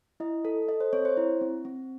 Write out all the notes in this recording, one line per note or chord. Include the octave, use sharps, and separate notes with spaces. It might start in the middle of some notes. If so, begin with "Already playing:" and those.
E4 D#5
A4
A4 D#5
C5
C4 C#5
C5
E4
C4
C4